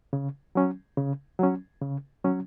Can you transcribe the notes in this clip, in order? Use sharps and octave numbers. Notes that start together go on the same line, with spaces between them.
C#3
F#3 C#4
C#3
F#3 C#4
C#3
F#3 C#4